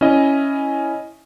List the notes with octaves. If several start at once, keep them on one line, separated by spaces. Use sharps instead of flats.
C#4 E4 D#5